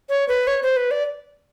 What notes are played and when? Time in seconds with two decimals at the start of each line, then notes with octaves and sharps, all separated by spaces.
0.09 C#5
0.28 B4
0.47 C#5
0.63 C5
0.77 B4
0.91 D5